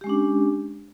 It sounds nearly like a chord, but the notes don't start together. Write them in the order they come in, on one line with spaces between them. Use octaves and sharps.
G4 G#3 C#4 D4